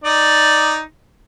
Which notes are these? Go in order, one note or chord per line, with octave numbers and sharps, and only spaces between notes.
D#4 D5